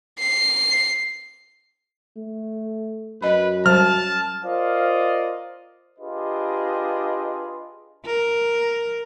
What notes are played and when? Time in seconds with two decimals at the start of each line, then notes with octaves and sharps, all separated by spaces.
0.19 C7
2.17 A3
3.22 F#2 B4 D#5 B5
3.66 F#3 G3 C5 A5 F6
4.45 F4 A#4 C5 D5 D#5 F5
5.99 D4 F4 G4 G#4 B4 D#5
8.06 A#4